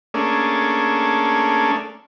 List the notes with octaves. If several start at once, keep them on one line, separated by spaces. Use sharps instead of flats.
A3 A#3 C#4 D4 G#4